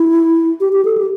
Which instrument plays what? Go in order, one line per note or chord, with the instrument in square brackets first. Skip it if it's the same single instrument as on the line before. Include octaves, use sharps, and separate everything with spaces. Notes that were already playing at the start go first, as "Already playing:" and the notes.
Already playing: [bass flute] E4
G4
G4
A4
G4